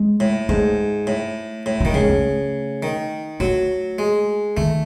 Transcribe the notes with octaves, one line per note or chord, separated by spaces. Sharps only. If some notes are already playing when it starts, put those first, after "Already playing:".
Already playing: G#3
A2
G#2 A3
A2
A2
D#3 F#3
C#3 G#3
A3
D#3
F#3 A3
G#3
D#3 A3